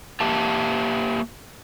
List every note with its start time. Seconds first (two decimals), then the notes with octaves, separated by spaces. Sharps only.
0.20 A#3 G4 E5 A5